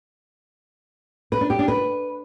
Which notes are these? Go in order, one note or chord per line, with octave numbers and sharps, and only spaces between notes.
B4
D4
G4
D4
B4